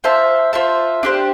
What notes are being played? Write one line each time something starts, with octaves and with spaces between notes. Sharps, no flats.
F4 C5 E5 A5
F4 C5 E5 A5
D4 G4 C5